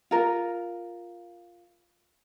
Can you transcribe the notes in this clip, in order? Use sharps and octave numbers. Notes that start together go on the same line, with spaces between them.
F4 A#4